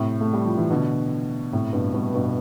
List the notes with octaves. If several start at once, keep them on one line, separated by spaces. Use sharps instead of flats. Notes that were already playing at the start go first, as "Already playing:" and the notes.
Already playing: A2 C3
A3
G3
F3
E3
B2 D3
A2 C3
G2 B2
G2 B2
G2 B2